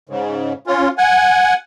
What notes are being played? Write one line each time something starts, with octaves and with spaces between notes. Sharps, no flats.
G#2 C#3
C#4 F4
F#5 G#5